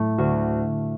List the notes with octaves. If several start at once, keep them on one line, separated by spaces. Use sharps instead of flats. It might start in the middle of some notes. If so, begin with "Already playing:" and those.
Already playing: A2 A3
D2 F#4